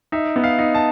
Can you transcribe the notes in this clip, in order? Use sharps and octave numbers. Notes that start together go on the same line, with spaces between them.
D#4 E5
B3
F5
D#4
A5